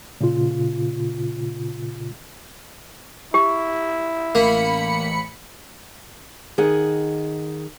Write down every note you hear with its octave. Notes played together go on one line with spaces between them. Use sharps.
A#2 C#3 F4
E4 G4
A1 A#3 B5 C#7
D#3 G#4 D#5 F#5